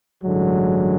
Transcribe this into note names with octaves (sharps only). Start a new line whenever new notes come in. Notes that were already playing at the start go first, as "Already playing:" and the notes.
A1 G2 D3 F#3 G#3